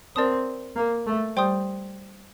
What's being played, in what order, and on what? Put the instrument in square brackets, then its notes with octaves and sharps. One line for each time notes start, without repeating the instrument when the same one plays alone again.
[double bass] C4 [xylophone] A#4 D5 A5 D#6
[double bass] A#3
A3
[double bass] G3 [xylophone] C5 G5 C6 D#6 G6